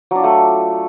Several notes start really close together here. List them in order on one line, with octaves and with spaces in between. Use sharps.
F#3 D4 F4 A3